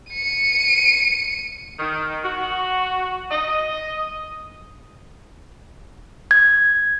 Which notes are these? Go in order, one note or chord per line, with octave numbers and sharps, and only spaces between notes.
C#7 D#7
D#3
F#4
D#5
G#6